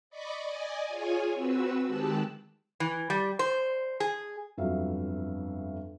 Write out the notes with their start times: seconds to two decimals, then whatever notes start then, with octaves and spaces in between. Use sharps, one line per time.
0.10 D5 D#5 B5 C#6 D6
0.45 D5 D#5 G#5
0.88 F4 G#4 C#5 G#5
1.34 C4 F#4 B4 E6
1.84 D#3 G#3 G4 A5 E6 F#6
2.80 E3
3.10 G3
3.39 C5
4.00 G#4
4.57 G1 F2 F#3 E5 F5